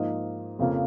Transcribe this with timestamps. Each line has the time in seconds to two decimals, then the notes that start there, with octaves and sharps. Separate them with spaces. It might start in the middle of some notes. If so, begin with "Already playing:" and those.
Already playing: G#2 F3 A#3 D#5
0.59 F2 C#3 F3 A#3